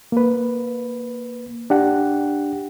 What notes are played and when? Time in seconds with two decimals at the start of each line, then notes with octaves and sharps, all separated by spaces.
0.12 A#3 B4
1.70 D4 G4 F#5